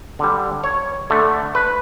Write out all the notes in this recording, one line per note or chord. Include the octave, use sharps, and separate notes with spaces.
D3 G3
C#5
D3 A3
B4